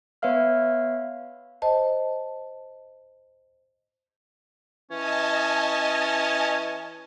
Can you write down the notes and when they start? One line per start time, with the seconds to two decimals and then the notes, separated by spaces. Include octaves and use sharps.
0.22 B3 B4 C#5 E5 F5 F6
1.62 C5 D#5 A5
4.91 E3 C#4 D#5 G#5 A5